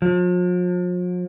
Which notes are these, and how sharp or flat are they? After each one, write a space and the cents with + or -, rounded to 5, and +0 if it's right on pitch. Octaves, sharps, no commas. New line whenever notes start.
F3 +45